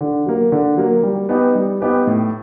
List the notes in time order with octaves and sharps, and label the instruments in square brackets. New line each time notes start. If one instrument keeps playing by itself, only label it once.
[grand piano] D3
F#3 A#3
D3
F#3 A#3
G3
B3 D#4 G4 B4
G3
B3 D#4 G4 B4
A2